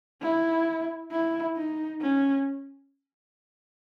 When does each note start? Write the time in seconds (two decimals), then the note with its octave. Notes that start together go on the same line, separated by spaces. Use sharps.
0.21 E4
1.12 E4
1.56 D#4
2.02 C#4